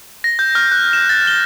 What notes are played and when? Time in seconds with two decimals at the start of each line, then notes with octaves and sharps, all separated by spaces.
0.24 A#6
0.39 G6
0.55 F6
0.72 F#6
0.93 E7
1.09 A6
1.27 G7